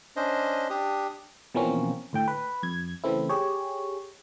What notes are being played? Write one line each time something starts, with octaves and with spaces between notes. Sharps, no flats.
C#4 D4 C5 D#5
D4 G4 D#6
B2 E3 F3 A#3 C4 C#4
D2 A2 G5
B4
F2 G#6
C#3 E3 A3 C4 E4
G4 G#4 C#5